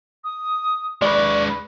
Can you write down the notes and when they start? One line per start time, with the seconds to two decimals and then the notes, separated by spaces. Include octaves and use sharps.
0.24 D#6
1.02 G#3 B4 D5 C#6